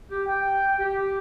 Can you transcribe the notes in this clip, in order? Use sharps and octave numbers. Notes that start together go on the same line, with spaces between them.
G4
G5
G4